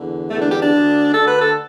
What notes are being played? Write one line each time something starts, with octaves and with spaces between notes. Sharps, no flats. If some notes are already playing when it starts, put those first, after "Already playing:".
Already playing: E2 D3
E2 D3 A3
D4
G4
D4
D2 D3
D2 D3 A4
B4
A4